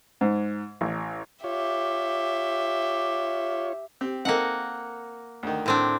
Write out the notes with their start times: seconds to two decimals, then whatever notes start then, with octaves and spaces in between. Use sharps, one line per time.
0.21 G#2
0.81 A1
1.44 F4 G4 C#5 E5
4.01 C4 G4
4.25 A#3 C4 D#4 A4 F#5
5.43 D2 D#3
5.66 A2 C4 D4